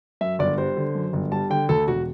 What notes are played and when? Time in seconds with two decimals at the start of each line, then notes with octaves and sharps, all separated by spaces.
0.21 F#2 E5
0.39 G1 D5
0.57 G3 C5
0.77 D3
0.95 F#2
1.13 G1
1.31 G3 A5
1.50 D3 G5
1.69 D2 A4
1.87 E1 F#4